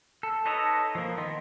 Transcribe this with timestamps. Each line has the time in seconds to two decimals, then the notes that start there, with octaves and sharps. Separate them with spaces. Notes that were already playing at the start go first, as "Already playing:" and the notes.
0.23 A4
0.46 D#4 A4 B4 C#5 D#5
0.95 F3 A#3
1.18 D#3 B3 D#5 C6